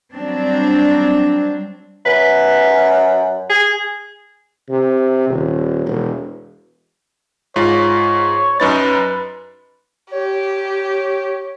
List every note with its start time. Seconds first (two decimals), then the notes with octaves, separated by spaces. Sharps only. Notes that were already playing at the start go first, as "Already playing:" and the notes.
0.14 F#3 G3 C4 D4
2.06 F#2 B4
3.50 G#4
4.69 C3
5.29 D#1
5.86 E1
7.56 G#2 F4 C#5
8.60 F#2 D#4 B4 A6
10.12 G4 C#5